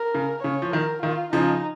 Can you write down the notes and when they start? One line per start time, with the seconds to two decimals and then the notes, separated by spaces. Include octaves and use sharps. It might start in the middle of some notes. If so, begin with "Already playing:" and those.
Already playing: A#4
0.14 C#3
0.43 C#3 C#5
0.62 F3
0.73 D#3 A#4
1.02 D#3 F4
1.33 C#3 F3 D#4